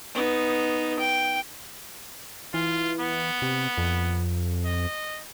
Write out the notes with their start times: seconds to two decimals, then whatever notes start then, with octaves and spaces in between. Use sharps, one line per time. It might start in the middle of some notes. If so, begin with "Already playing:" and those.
0.15 B3 D#4
0.99 G5
2.54 E3 F4
3.00 B3
3.42 C3
3.78 F2
4.65 D#5